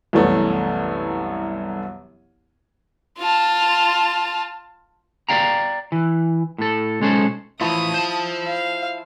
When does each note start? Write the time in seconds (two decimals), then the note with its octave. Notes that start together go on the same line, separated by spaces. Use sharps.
0.13 C2 F#2 E3 F#3 A3 B3
3.18 F4 A5
5.29 D5 F5 G5 A#5
5.92 E3
6.58 A2 A4
7.00 B1 G#3 C#4 A4 C5
7.61 E3 F3 A3 E4 D#6
7.94 C5 A5
8.46 F5